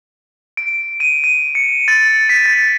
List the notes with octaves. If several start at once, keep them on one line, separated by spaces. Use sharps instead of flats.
D7
D#7
D#7
C#7
A6
B6
A6